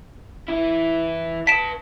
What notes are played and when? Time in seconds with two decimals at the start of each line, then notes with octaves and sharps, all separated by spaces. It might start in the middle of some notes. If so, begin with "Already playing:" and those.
0.48 E3 E4
1.47 B4 A5 B6 D7 E7